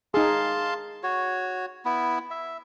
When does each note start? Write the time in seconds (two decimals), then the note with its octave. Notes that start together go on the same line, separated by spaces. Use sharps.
0.14 D#4 G#4 F5 A5 C6
1.03 F#4 C#5
1.85 B3 E4
2.31 E5